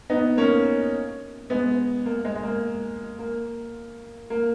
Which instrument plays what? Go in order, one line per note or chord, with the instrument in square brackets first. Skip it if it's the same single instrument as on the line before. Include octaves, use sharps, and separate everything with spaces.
[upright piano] B3 D#4
A#3 C#4
G#3 B3
A#3
G#3
G#3
A#3
A#3
A#3